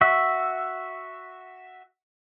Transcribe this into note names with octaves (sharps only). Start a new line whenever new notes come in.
F#4 E5